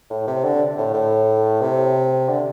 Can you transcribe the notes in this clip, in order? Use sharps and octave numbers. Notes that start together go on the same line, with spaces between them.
A2
C3
D3
A2
A2
C3
D3